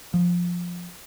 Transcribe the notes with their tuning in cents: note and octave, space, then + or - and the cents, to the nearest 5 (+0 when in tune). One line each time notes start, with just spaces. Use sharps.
F3 +10